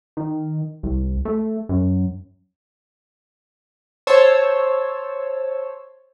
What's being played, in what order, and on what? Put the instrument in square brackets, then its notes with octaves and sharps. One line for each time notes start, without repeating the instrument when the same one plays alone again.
[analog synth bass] D#3
C2
A3
F#2
[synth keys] C5 C#5 A5 E6